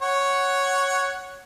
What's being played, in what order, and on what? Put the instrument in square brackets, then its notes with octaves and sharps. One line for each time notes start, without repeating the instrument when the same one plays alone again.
[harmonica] C#5 F#5